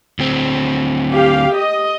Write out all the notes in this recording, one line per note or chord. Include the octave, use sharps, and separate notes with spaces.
D2 C4
G4 F5
D#5